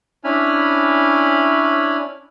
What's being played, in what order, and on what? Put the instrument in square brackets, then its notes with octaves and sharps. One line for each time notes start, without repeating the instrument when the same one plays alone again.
[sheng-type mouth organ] C#4 D4 E4 G#5 B5 F6